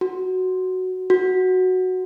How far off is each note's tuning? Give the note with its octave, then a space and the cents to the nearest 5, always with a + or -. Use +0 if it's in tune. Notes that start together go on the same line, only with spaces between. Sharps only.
F#4 +5
F#4 +0